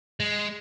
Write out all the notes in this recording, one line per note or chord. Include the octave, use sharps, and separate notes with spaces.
G#3